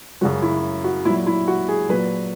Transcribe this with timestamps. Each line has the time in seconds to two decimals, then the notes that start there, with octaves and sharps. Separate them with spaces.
0.21 F#2 C#3 F#3 F#4
0.42 E4
0.84 F#4
1.05 A#2 E4
1.10 F#3
1.27 E4
1.48 F#4
1.68 G#4
1.89 A#2 F#3 B4